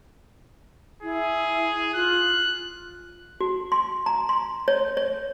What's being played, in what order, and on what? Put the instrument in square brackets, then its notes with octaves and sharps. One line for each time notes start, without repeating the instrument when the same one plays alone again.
[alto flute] E4 [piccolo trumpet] G#4
[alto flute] F4 [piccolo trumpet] F#6
[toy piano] F#4
C6
A#5
C6
C#5
C#5